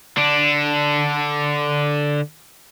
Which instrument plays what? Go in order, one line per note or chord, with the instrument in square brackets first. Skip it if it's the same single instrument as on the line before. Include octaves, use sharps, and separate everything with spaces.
[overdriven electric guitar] D3 D4